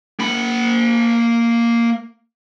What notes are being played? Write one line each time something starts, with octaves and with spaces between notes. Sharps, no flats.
A#3 B5